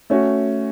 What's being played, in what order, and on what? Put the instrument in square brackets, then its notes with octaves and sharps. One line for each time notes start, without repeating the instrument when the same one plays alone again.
[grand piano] A3 C#4 F#4